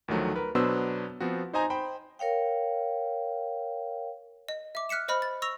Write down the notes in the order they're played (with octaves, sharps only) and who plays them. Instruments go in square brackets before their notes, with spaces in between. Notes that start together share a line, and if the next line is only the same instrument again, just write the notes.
[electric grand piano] D2 D#3 F3 F#3 A3
A#4 B4
B2 F#3 B3 D4 C5 E6
F3 B3 C4 F#4
D#4 C5 D#5 G#5 A#5
C5 G5 B5
[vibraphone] A#4 C#5 F5 G5
[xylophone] D#5
E5 D6
F6 F#6 B6 C#7 E7
C5 D#5 B5 F6
A6
C#6 E6 A#6 F7